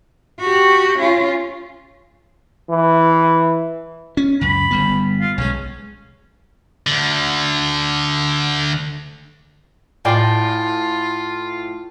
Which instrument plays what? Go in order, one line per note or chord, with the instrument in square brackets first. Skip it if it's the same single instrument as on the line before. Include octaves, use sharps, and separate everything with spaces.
[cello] F#4 G4
C#4 F4
[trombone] E3
[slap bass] C#4
[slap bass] C#2 F#2 [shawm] B5
[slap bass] G1 G3 B3
[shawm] F4
[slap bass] B1 G#3 [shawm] C#4
[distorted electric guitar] D2 D3
[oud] A2 [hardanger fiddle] F4 [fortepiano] D5 G5 G#5